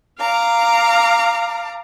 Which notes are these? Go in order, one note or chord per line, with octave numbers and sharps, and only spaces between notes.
F5 A#5 D6